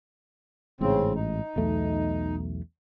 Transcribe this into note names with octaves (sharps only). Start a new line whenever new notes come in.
A1 G#2 C#3 C4
D#4
B1 E2 A3